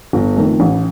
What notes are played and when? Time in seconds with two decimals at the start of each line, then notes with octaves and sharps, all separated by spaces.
0.13 G1
0.37 F2 D#3 A3
0.60 A1